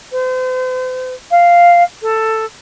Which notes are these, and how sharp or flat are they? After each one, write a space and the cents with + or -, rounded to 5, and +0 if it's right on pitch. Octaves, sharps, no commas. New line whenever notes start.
C5 -40
F5 -5
A4 +10